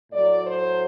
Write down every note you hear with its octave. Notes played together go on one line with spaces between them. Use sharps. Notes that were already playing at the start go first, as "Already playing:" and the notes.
A2 F#3 A3 D5
C5